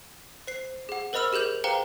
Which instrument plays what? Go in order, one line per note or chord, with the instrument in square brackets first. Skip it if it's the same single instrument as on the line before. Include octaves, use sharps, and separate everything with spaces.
[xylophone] C5 C7
G#4 F#5
A#4 C5 D#5 B5 E6 F6
G4 G#4 A#4 G6 F7
G#4 B4 C5 F5 G5 A#5